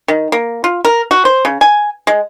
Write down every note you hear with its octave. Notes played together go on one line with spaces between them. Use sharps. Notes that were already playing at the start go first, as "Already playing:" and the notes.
D#3
A#3
F4
A#4
F#4
C5
C#3
G#5
G#3